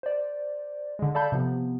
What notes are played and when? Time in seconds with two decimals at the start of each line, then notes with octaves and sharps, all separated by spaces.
0.03 C5 D5
0.99 D3 G#3
1.15 A4 D5 F5 A5 B5 G6
1.32 C3 F3 B3